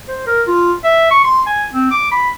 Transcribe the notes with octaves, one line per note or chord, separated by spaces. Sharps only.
C5
A#4
F4
E5
C#6
C6
G#5
C4
D6
B5